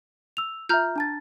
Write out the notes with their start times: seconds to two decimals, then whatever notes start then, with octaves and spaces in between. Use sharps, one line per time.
0.37 E6 F7
0.69 F4 E5 A#5 F6 G6
0.96 D4 A5 A6